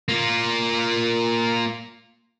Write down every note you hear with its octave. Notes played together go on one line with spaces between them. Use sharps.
A#3 F4